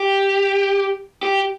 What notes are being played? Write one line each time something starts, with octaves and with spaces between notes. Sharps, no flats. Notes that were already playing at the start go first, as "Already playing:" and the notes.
Already playing: G4
G4